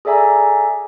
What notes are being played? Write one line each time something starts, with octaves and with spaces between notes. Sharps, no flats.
G#4 A4 D5 E5 G#5 A#5